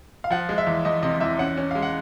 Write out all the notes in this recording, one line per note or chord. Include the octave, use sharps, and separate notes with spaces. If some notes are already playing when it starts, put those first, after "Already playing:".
F5
F3 F#5
G#3
E5
E2
E2 D#5
C3 D#5
E2 E5
C#4 F#5
C#4
G#3 F5
F#5